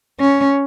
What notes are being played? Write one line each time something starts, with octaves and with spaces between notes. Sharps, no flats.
C#4